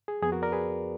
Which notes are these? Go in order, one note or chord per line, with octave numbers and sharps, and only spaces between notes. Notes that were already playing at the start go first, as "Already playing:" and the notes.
G#4
F2 F3 B3 G#4
F#4 A#4
A#4 D5
G#4 B4